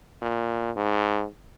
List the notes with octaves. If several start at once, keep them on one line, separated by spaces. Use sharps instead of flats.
A#2
G#2